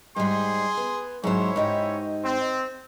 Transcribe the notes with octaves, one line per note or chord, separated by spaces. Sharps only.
G#2 G3 G#4 C6
B3
G#2 F#3 C#4 E4 C5 C#5
G#2 D#4 G4
C4